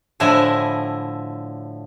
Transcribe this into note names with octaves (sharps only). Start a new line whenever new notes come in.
A2 D3 F3 E4 D#5 G#5